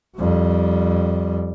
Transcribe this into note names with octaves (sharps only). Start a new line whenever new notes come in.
F2 G3